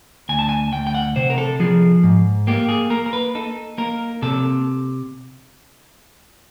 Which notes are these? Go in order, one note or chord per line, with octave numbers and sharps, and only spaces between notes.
D2 G#5
A5
G#5
D2 G5
G5
F#5
C3 C5
A#4
A4
F3 G#4
G#2
A#3 G4
G#4
A#3 A#4
A#4
B4
D#4 A4
A#3 A#4
C3 A4